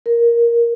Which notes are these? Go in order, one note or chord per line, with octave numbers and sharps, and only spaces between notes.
A#4